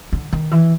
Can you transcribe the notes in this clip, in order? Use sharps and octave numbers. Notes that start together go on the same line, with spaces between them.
D3
D#3
E3